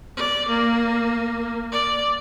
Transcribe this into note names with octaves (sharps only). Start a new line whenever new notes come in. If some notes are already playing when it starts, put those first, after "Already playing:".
D5
A#3
D5